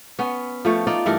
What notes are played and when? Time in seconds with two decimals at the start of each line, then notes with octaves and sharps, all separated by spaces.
0.19 B3 C#4
0.65 F3 A3 C#5
0.87 D#4 F4 D5
1.06 G2 E3 A3 A#4